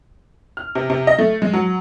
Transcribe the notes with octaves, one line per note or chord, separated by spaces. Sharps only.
F6
C3
C3
D#5
A3
G#3
F#3